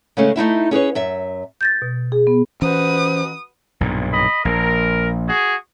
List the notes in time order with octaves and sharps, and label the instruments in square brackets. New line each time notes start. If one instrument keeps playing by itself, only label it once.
[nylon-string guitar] C#3 G#3 A3 C#4
A3 D#4 E4 E5
C#4 G#4 B4 C#5
F#2 E5
[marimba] G6 A6 A#6
B2
G#4
B3
[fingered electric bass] E3 C#4 [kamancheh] F#4 B4 [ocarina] C5 [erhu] D#6
[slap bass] B1 G2 A#2
[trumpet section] D#5 B5
[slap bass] A#1 [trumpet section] A#4
[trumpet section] F#4 G#4